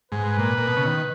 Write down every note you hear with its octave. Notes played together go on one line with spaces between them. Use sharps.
G#2 B4
A#2
A#2
B2
C#3
D#3